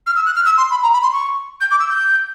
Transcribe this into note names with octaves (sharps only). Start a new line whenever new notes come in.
F6
E6
F#6
F6
E6
C6
B5
A#5
B5
C6
C#6
G6
D6
E6
G6